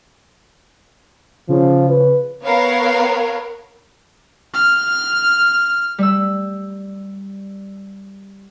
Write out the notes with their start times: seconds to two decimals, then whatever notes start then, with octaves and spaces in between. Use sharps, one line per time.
1.49 C#3 F3
1.89 B4
2.44 B3 A#4 C#5 F5
4.54 F6
5.98 G3 E6